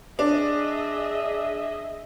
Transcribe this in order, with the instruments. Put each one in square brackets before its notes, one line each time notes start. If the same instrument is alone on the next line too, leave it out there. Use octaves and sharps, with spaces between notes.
[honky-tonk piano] D4 [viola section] G#4 D#5 E5